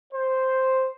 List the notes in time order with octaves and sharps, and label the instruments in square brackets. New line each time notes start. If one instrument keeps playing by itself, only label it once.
[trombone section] C5